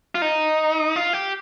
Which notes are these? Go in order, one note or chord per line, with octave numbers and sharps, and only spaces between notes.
F4
D#4
F4
G4